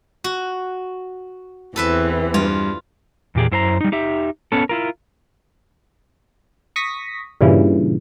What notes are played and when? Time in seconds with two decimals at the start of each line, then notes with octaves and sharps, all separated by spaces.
0.24 F#4
1.76 E2 E3 C4 A4 B4 E5
2.34 G2 F4
3.35 E2 A#2 G4 G#4
3.51 F#2 E4 C5 A5 A#5
3.81 G3 D#4
3.92 D#4 G4 E5
4.52 B3 C#4 A4
4.69 E4 F4 A#4
6.76 C#6 D#6 A#6 B6
7.41 G2 A#2 C#3 E3